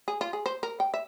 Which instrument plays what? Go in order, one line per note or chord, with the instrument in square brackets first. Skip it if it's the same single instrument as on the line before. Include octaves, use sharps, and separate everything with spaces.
[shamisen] G#4
F4
G#4
C5
A#4
G5
E5